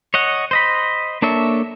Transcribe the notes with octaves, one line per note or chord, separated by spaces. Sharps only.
C#5 D#5 F#5
C5 D#5 B5
A#3 D4 A4 C#5 E5